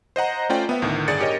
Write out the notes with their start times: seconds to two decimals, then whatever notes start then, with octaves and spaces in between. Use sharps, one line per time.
0.16 C5 D#5 F#5 A#5
0.49 A3 C#4 F4 C5 D5 G5
0.69 B3 E5
0.82 D2 A2 D#3
1.08 G1 G#4 D5 A6 C#7
1.21 G4 A#4 C#5 D#5